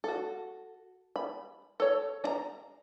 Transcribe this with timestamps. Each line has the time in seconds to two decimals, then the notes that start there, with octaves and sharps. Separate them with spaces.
0.04 F#4 A4
1.16 B5
1.80 A4 C#5
2.24 D4 A#5